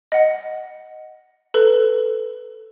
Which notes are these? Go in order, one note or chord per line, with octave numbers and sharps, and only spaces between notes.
D#5 F#5
A4 B4